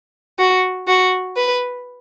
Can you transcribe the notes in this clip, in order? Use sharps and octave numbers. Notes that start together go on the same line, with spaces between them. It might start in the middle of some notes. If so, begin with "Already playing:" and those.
F#4
F#4
B4